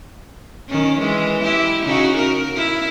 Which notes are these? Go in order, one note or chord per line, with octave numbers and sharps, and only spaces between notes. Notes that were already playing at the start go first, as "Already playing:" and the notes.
D#3 C#4
E3 G#3
E4 G4
C#3 D#4 F#4
A#4
E4